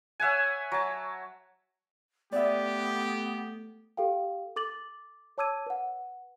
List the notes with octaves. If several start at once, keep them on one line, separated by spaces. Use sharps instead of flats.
C#5 E5 F#5 G#5
F#3 A5
A3 B3 G4 D5 E5
G4 A4 F5 G5
A4 D6 A6 F#7
C#5 A5 D6 E6 G#6 D#7
B4 F#5